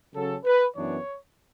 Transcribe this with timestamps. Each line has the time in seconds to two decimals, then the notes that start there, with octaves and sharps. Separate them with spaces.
0.14 C#3 F#3 C#4 A4
0.44 B4
0.75 F#2 E3 B3 D4 C#5